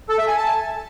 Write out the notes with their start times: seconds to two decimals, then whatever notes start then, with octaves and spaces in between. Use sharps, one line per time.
0.09 A4
0.18 E5
0.28 G#5
0.37 A5